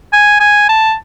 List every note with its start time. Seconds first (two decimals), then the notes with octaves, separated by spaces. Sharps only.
0.13 G#5
0.40 G#5
0.69 A5